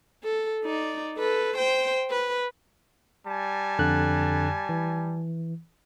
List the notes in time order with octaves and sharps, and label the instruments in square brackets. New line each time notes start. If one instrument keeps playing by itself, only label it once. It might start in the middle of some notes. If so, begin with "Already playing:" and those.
[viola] A4
D#4 D5
A4 B4
C5 G5
B4
[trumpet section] G3 G#5 A5
[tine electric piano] F2 D3 F#6
E3